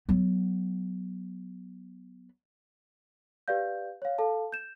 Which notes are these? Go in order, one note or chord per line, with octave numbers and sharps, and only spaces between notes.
F#3 B3
G4 B4 D5 F5 G6
C#5 F5
A4 F5 A5
G6 E7